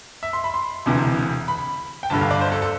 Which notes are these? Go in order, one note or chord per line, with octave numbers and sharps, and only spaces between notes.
E5
C6
B5
C6
E1 D2 C3 E3
B5
G5
G1 G2 D3 A5
F5
D5
C5
A4
A4